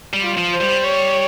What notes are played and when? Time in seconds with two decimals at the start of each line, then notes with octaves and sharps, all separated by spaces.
0.13 G3
0.22 F4
0.37 F3
0.53 C5
0.61 G3
0.84 C#5